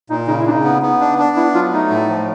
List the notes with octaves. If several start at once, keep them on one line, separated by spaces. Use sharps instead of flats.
A#2 D#4
C#3 D#4
E4
C#3 D4
D#4
B3
B3
D4
D4
B3 E4
F#3 F4
A3 D#4
A2
F3